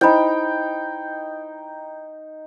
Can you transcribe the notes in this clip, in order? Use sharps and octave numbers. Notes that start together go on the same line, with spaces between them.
D#4 E4 C5 G5 B5